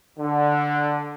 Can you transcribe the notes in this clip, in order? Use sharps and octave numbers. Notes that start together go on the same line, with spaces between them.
D3